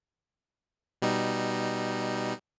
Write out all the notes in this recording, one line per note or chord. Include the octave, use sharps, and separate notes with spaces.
B2 G3 D#4